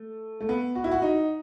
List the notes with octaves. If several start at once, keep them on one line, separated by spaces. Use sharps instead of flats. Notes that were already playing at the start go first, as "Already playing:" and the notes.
Already playing: A3
A3
B3
F#4
E4
F#4
D#4